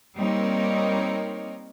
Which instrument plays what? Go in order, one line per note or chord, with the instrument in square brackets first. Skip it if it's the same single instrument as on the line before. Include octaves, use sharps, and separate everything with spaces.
[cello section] G3 A#3 C4 D#4 A#4 C#5